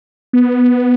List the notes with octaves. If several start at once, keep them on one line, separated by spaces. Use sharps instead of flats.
B3